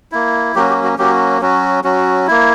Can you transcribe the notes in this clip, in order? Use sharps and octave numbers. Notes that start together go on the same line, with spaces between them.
A#3 E4
F#3 A#3 C#4 F#4 G4
G4
F#4
F#3 A#3 C#4 F#4 G4
F#3 C#4 F#4
F#3 C#4 F#4
A#3 E4